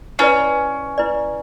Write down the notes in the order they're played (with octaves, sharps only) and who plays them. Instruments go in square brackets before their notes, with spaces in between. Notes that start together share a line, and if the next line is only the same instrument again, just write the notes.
[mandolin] C#4 [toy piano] E4 B4 D5
[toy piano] E4 B4 D5